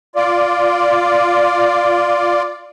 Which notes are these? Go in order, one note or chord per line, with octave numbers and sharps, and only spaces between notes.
F4 D5